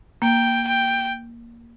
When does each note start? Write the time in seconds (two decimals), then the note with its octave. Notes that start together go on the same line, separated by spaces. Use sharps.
0.22 A#3 G5
0.67 G5